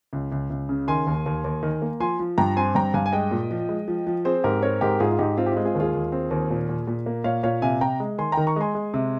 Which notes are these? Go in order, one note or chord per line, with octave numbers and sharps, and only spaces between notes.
C#2
C#2
C#2
C#3
D#3 G#5 C6
D#2
D#2
D#2
D#3
A#3
F3 G#5 C6
F3
G2 G5 A#5
C4 G#5 C6
G2 G5 A#5
G2 F5 G#5
G#5
G#3 D#5 G5
A#2
F3
G#3
F3
F3
C4 G#4 C5
G#2 G4 A#4
C4 A#4 C#5
G#2 G4 A#4
G#2 F4 G#4
F4
G#2 D#4 G4
C4 F4
G4
F4
G#3
F4 G#4
D#2
F4 G#4
D#2
C4
D#2
A#2
A#2
A#2
A#3
A#2 C#5 F5
A#2 C#5 F5
C3 F5 G#5
C3 G5 A#5
G#3
D#3 G#5 C6
D#3 G5 A#5
A#5 C#6
G#3 G#5 C6
G#3
C3